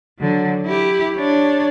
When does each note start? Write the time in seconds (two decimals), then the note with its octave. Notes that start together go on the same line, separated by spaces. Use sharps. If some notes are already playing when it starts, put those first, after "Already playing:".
0.19 D3 F#3
0.66 E4 G4
1.15 D4 C#5